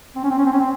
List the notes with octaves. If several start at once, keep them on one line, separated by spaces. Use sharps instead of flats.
C4
C#4
C4
C#4
C4
C#4
C4